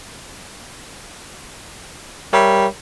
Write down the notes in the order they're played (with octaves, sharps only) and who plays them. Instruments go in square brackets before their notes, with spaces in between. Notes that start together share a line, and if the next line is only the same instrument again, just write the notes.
[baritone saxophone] G3 [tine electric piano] A#4 C#5 E5